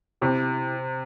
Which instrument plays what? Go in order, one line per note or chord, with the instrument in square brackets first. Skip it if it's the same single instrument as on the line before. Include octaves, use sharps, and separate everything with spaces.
[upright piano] C3 [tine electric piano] E4 G4